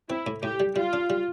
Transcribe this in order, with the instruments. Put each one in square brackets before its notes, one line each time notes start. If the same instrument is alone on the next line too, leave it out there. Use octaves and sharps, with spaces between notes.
[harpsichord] C4 [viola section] E4
[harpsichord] A2
[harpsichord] A2 [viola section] G4
[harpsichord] G3
[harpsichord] G3 [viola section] F4
[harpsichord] D4
G3